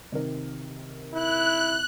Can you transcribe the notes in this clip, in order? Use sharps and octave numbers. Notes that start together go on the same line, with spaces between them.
C3 D#3 A#4
E4 F#6